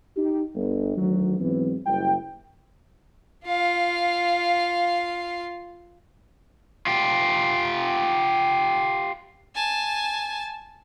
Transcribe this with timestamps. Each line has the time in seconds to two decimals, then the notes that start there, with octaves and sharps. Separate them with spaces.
0.16 D#4 G4
0.55 G1
0.97 D2 D#3 F#3
1.40 G#2 E3 F#3 B3 C4
1.86 F#1 G3 E4 G5
3.46 F4 F5
6.87 F4 G4
9.55 G#5 A5